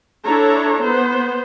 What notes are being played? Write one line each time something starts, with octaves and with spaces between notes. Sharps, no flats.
D4 E4 A4 C#5 A#5
B3 C5